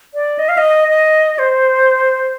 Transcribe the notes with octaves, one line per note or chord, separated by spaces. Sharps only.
D5
D#5
F5
D#5
D#5
C5